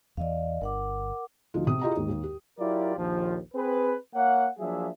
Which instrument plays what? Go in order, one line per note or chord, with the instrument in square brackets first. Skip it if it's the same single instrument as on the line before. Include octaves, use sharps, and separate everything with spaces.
[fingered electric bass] E2 E3 [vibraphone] D5 D#5 F5
[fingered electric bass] G1 [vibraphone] A#4 F#5 D6
[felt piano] D2 F3 D#4 F4
C3 D#6
E4 F4 G4 G#4 D#5 A#5
D#2 G#2
D#2
G4
[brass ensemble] F#3 E4 F4 G4 A#4 D5
A#1 D#2 F3
C4 G#4 B4
A#3 C#5 F5 F#5
F3 F#3 A#3 D4 G#4 E5